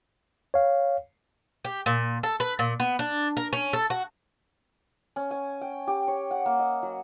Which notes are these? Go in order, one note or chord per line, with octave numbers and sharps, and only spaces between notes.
C#5 F5
G4
A#2
A4
B4
A#2
B3
D4
A#4
C#4
A4
F#4
C#4
G#5
G5
G4
C#5
F#5
A#3
D#5
F#3